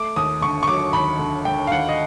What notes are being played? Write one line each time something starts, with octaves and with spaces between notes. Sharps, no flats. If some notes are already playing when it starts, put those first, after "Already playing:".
Already playing: A3 D6
D#2 D#6
D3 C#6
C#6
F#3 D6
D#2 B5
D3
D3 G5
F5
D#2 F#5
D#5